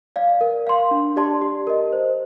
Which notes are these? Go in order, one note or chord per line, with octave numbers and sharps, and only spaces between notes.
D5 F5
A#4
F5 C6
D4
G4 D5 A5 C6
G4
A#4 D#5
C5